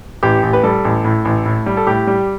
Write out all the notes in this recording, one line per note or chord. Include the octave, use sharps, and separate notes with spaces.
A1 G4
A1
B4
G3 A4
A1
A2
A1
A2
G3
A4
A2 G4
G3